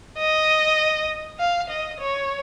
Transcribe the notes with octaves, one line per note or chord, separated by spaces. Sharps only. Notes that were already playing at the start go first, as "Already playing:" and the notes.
D#5
F5
D#5
C#5